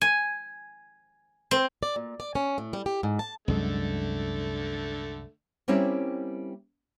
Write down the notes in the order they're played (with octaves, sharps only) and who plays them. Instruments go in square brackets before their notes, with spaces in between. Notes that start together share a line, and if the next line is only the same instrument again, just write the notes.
[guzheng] G#5
C4
[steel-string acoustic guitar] D5
A#2
D5
C#4
A2
G3
G4
G#2
A5
[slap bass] C2 F#2 G#3 [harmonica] D3 A3
[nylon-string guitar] G3 A#3 C4 C#4 E4